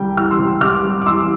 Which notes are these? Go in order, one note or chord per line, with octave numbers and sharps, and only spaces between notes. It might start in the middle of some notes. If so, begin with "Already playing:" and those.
Already playing: C2 G3 G5
E3 F6
C6 E6
C3
C2 D6 F6
G3
D6
E3 C6 E6